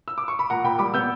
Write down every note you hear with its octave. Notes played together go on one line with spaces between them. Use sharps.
E6
D6
C#6
B5
A#2 F#5 A#5
A#2 G5 B5
G3 B5 D6
B3 E6 G6